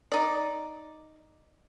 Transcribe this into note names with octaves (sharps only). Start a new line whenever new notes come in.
D#4 D5